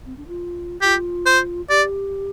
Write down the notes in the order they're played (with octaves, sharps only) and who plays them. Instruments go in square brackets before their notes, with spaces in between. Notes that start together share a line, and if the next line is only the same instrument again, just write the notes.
[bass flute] C4
D4
F4
[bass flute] F4 [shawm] G4
[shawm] C5
[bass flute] G4 [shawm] D5